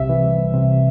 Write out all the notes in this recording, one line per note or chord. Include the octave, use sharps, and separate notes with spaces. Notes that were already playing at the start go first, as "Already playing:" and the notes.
Already playing: C2 C3 E5
E3
C2
C2
C3